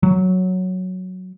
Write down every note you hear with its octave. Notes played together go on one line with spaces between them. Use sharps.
F#3